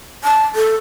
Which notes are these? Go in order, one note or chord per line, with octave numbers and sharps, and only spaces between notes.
A5
A4